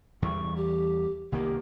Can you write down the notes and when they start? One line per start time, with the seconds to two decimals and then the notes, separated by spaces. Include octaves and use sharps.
0.22 E2 E3 G3 C#6
0.55 G4
1.32 C2 D#3 A#3 G4